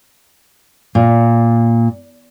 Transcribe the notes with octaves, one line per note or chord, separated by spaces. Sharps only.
A#2